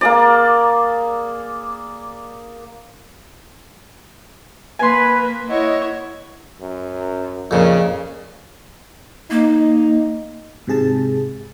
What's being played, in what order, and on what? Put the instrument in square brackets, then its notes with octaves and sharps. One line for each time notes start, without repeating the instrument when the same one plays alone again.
[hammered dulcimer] A#3 G#4 D5
[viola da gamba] A#3 [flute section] B4 [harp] G#5 C6
[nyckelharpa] E4 C#5 [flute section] D#5 F#5
[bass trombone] F#2
[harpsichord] F2 A#2 [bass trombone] C#3
[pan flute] A#3 [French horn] D#4
[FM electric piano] G#2 C3 G#4 A5